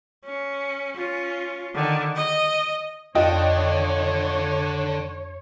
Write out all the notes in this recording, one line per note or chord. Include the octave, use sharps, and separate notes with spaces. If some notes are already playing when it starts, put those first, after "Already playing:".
C#4
C#4 F4
D3 D#3
D#5
F2 D3 D4 F4 C#5 D#5 G5